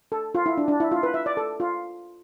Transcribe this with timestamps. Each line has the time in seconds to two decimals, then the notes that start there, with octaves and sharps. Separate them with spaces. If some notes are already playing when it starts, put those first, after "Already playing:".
0.12 A4
0.35 F4
0.46 E4
0.57 D4
0.68 D4
0.80 E4
0.92 F4
1.03 B4
1.14 E5
1.26 D5
1.37 A4
1.60 F4